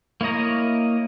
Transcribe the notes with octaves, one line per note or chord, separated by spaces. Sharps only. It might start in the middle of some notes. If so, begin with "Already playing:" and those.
A#3 E4 C#5 D#5 A#5